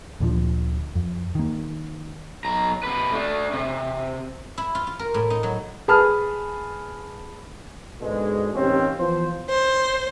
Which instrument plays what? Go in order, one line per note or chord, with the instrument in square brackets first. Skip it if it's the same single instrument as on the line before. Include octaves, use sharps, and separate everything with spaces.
[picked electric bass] D2 A#2 D3 F3
F2
D#3 A#3
[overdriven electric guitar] B1 A#5
C3 B4
A3 D4
C3
[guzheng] E4
F4
F4
A#4
A2
D#4
F#3
[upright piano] G#4 B4 A5 B5 D#6 F6
[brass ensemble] G#2 B2 D3 G#3
A1 D#2 C3 C4 C#4
E3 F3 B3 C5
[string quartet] C5